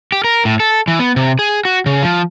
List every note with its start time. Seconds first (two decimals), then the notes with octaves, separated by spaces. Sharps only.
0.12 G4
0.24 A#4
0.45 A2
0.60 A4
0.88 E3
0.99 B3
1.16 C3
1.39 G#4
1.65 F#4
1.86 C#3
2.03 F3